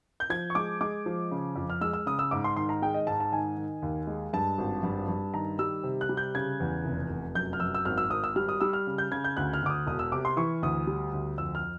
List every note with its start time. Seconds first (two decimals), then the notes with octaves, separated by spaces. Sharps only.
0.20 G6
0.30 F3 G#6
0.50 C#6
0.55 G#3 D6
0.81 G#3 D6
1.06 F3
1.31 C#3
1.56 F2
1.70 F6
1.81 G#3 E6
1.93 E6
2.06 C#3 D#6
2.19 E6
2.31 G#2 D6
2.44 C6
2.56 D#3 C6
2.69 A#5
2.82 G#3 G5
2.94 D#5
3.07 G#2 A5
3.20 A5
3.32 D#3 G#5
3.57 D#3
3.82 D#2
4.07 G#3
4.33 G2 A5
4.58 G#1
4.83 G2
5.08 G2
5.34 D#3 A#5
5.59 G3 E6
5.84 C3
6.01 F#6
6.09 G3
6.17 G6
6.35 C#3 G#6
6.60 E2
6.85 F1
7.09 F1
7.35 F#2 G6
7.53 F6
7.60 F#2 E6
7.74 E6
7.85 G#1 F6
7.98 E6
8.10 G#1 D#6
8.24 E6
8.36 G3 F6
8.49 D#6
8.61 G3 E6
8.73 F6
8.87 C#3
8.98 G6
9.11 C#3 G#6
9.24 G6
9.37 D2 F#6
9.53 F6
9.62 D2 D6
9.70 D#6
9.87 E1 D#6
9.99 E6
10.12 C3 D6
10.25 C6
10.37 E3 C#6
10.62 D2 D#6
10.87 G3
11.13 D2
11.38 F2 E6
11.55 F6